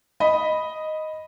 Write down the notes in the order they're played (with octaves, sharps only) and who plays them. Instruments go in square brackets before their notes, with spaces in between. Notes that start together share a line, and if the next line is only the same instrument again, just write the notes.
[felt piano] D#5 B5